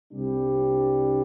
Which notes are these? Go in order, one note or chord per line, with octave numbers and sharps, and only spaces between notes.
C2 C3 G3 D4